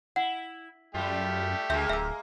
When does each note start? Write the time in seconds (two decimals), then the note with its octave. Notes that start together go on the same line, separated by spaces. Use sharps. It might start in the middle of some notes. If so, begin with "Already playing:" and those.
0.16 E4 F#5
0.94 F#2 G3 A3 F4 G4
1.70 D2 G#3 A#3 E5 G6
1.90 D1 E5 E6